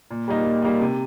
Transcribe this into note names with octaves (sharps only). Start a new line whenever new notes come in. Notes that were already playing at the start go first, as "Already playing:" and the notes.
A#2
G3 A#3 D#4
A#2
G3 A#3 D#4
C3